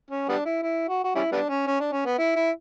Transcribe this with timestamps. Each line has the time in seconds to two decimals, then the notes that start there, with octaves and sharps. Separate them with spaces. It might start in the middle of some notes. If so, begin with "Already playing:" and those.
0.10 C#4
0.29 G3 B3 D4
0.45 E4
0.63 E4
0.88 F#4
1.04 F#4
1.15 G3 C#4 E4
1.32 G3 B3 D4
1.49 C#4
1.67 C#4
1.80 D4
1.92 C#4
2.05 B3
2.18 E4
2.36 E4